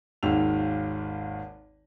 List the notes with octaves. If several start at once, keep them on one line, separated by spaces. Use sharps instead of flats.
G#1 D#2 D#3 G#3 E6 F7